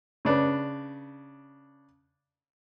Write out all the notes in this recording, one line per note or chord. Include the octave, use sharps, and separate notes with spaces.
C#3 D4 B4